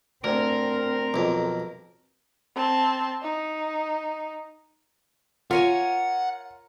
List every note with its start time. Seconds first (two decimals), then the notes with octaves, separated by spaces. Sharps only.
0.24 D2 C4 A#4
1.14 B1 F2
2.55 C4 A5
3.22 D#4
5.51 F4 A#4 C#5 F#5 G#5